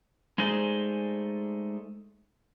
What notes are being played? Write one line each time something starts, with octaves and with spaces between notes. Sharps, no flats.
G#3 A3 D#4 G#4 C5 D5